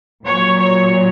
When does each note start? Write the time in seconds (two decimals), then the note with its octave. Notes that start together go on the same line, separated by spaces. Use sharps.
0.25 A#2 F#3 C#5
0.59 C#5